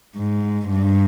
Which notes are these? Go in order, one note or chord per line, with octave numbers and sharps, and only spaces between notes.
G#2
G2